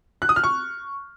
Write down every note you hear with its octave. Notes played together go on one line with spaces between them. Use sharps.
F#6
D#6
F6
C#6